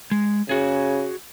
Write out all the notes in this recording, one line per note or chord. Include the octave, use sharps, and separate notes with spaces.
G#3
C#3 F#4 G#4